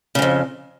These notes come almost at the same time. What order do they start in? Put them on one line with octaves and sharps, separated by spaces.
C#3 G#2 F2